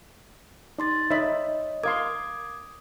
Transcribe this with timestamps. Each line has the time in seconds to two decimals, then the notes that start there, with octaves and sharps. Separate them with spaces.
0.79 D#4 D5 C6 A6
1.10 D#4 C#5 D#5 E5 B5
1.84 A#4 F5 C6 D6 D#6 G#6